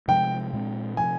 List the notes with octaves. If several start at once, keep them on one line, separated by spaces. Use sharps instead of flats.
C3 F3 G#3 G5
A#2 G#3 C4
C3 F3 G#5